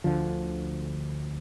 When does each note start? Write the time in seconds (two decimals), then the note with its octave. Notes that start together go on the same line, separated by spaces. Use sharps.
0.04 D2 D3 F3